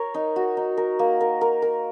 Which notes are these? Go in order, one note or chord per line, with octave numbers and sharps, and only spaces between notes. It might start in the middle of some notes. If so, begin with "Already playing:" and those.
Already playing: A#4 C#5
D#4
F#4
D#4
A#4
A#3
A#4
A#4
A#4